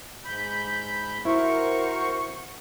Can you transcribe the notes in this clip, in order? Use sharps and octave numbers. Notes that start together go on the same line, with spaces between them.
G#2 B5 G6
E4 F#4 A#4 C5 C#6